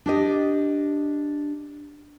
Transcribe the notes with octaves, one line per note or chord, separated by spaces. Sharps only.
D4 G4 D#5